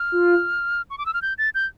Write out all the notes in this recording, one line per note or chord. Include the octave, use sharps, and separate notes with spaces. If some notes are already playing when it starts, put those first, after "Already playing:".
Already playing: F6
F4
C#6
D6
E6
F6
G6
A6
G6